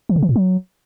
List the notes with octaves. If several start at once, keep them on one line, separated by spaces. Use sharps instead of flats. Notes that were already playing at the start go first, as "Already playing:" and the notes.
E3
C#3
E3
A2
F#3